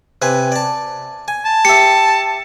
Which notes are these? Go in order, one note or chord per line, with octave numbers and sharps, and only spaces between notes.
C3 B4 G#5
D5 A5
G#5
A5
G4 E5 C#7